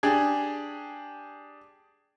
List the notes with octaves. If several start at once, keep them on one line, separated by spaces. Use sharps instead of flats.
D4 G4 G#4